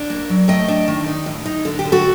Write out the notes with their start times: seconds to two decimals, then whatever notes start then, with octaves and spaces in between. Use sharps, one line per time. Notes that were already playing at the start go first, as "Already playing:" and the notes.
Already playing: D4
0.10 A#3
0.29 F#3
0.48 A3 D#5 G5
0.68 D4
0.88 D#3
1.06 D#4
1.26 A2
1.46 D#4
1.65 D3 A4
1.79 G4
1.85 D3
1.92 F#4 A4